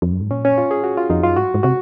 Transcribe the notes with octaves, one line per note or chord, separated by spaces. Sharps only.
F2
F#2
G#2
A#2 C#4
C#4
F4
G#4
F#4
F4
F2 D#4
F#2 F4
G#2 F#4
G#2
C3 F#4